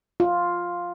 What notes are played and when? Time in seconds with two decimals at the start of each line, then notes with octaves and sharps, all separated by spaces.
0.20 F4